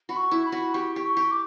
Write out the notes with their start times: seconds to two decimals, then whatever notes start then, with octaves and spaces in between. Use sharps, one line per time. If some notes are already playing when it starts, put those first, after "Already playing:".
0.09 F#4 B5
0.17 C#6
0.31 E4
0.46 B5
0.52 F#4
0.74 G4 C#6
0.96 G4
1.03 C#6
1.17 G4
1.31 D6